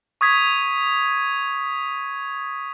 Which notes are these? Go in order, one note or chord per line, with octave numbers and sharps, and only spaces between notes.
C#6 D#6 G#6 B6